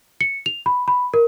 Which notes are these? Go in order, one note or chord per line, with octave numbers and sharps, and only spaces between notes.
C#7
F7
B5
B5
A#4